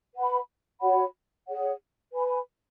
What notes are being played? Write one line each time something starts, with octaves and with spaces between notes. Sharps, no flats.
B4 F#5 B5
F#4 C#5 F#5 B5
G#4 C#5 F#5
B4 G#5 B5